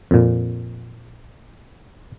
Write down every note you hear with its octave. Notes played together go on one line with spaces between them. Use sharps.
F2 A#2